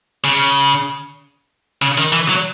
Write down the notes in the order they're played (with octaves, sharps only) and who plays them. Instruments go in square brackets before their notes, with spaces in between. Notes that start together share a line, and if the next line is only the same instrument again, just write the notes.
[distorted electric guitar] C#3
C#3
D#3
E3
F#3